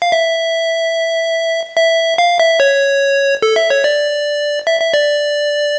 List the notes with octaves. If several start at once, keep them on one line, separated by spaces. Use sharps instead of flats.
F5
E5
E5
F5
E5
C#5
A4
E5
C#5
D5
E5
E5
D5